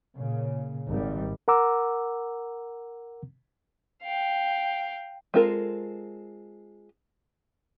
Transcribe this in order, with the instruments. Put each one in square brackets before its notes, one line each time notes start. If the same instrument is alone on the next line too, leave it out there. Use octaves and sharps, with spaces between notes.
[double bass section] A#2 C#3
G#1 G3
[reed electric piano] A#4 F#5 A#5 D6 E6
[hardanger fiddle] F5 G5
[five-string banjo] G#3 C4 F4 A4 A#4